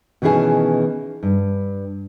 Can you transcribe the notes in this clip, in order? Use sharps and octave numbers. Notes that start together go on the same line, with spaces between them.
B2 D#3 E3 C#4 G#4 A5
G2